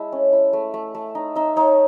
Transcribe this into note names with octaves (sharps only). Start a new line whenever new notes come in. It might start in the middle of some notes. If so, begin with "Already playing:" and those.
Already playing: G#3 E4 A5
C#4
E4
A3
A3
A3
D#4
D#4 E5
D#4 C#5